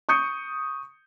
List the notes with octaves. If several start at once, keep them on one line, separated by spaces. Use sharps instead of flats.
C#6 D#6 G6 C#7